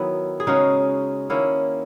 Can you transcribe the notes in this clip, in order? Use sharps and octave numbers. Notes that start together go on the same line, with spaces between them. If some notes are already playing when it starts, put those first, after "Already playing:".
Already playing: D#3 F#3 B3 E4
G#4
C#3 G#3 C#4 D#4 F#4
D#3 A#3 C#4 E4